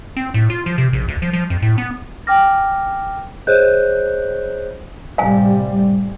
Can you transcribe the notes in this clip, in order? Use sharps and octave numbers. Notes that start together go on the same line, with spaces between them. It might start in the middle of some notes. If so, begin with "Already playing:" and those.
C4
A2
F4
F3
C3
A#1
D2
F3
F3
F2
A2
B3
G5 G#5 D6 F6 A#6
G#4 C5 C#5 D#5 F#6 G6
A2 C3 G3 F5 G#5